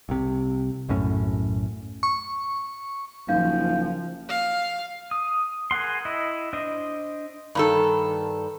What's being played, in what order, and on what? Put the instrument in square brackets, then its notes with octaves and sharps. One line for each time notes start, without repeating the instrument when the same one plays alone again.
[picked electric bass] C2 C3
B1 F#2 A2 C#4
[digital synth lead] C#6
[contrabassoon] F#1 [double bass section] F3 [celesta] D#4 F5 G6
[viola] F5
[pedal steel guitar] D#6
G#4 A#4 F#5 C6
E4 D#5
D4 C5 D#5
[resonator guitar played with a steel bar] G2 D#3 A4